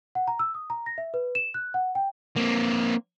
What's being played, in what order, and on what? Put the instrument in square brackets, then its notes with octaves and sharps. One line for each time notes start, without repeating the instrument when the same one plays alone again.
[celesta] F#5
A#5
E6
D#6
A#5
A#6
E5
B4
E7
F#6
F#5
G5
[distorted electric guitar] A#3 C4